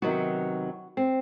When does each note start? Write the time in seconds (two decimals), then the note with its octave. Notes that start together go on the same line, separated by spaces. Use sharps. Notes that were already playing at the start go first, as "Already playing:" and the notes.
0.02 C3 D#3 F#3 B3 F#4
0.97 C4